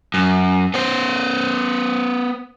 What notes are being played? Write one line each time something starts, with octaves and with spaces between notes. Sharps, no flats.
F#2
B3 C5